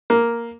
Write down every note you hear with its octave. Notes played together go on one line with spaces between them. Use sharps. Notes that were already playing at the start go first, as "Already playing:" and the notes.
A#3